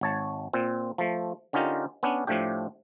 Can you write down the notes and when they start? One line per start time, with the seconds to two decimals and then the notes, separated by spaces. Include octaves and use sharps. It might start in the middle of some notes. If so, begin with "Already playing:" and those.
0.01 G#1 C#5 A5
0.53 A#2 C4
0.98 F3 A3
1.53 D3 C#4 D#4 F4 G4 A#4
2.03 B3 C#4 D4
2.27 A2 F3 A3 D4 G4